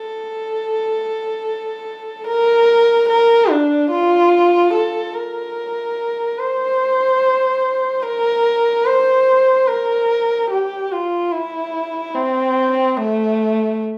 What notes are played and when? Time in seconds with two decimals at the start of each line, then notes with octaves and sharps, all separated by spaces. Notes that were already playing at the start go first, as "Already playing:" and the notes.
Already playing: A4
2.27 A#4
3.09 A#4
3.50 D4
3.90 F4
4.73 A4
5.14 A#4
6.38 C5
8.02 A#4
8.85 C5
9.67 A#4
10.50 G4
10.92 F4
11.32 E4
12.15 C4
12.98 A3